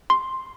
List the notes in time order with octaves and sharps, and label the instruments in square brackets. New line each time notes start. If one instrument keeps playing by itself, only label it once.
[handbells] C6